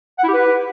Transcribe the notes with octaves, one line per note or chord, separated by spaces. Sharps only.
F#5
E4
G4
B4